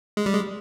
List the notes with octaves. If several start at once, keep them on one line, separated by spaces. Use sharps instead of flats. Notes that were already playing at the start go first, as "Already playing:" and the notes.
G#3
G3
G#3